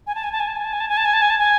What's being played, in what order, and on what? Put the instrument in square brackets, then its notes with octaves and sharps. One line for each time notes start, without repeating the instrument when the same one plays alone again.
[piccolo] G#5
A5
G#5
A5
G#5
A5
G#5
A5
G#5
A5
G#5
A5
G#5
A5
G#5
A5
G#5